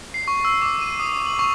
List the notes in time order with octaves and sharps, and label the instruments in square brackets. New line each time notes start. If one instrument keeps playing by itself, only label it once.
[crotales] C7
C#6
E6
D6
D#7
D#6
F#7
C#6